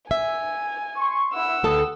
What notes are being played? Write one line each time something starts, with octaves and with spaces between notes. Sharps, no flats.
E5 G#5
C6 C#6
E4 F#5 E6
D2 G4 A4 B4 A5 D#6